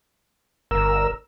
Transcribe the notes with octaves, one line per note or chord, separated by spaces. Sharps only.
G1 A#4 E6